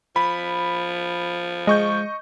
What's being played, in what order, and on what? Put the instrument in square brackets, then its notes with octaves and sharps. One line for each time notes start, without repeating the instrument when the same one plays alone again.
[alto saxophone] F3 [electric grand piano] B5
[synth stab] G#3 [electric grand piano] D#5 C#6 G6